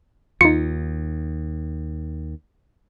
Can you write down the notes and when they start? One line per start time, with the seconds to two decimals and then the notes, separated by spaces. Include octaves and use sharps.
0.41 D#2 D#4 F4 C#7